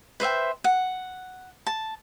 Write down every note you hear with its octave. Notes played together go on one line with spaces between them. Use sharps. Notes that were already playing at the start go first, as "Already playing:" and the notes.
B4 C5 E5 G5
F#5
A5